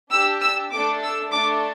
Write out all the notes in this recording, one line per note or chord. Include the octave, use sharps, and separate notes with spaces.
D4 G4 E6
E6
A3 D4 A4 D6
E6
A3 D4 A4 D6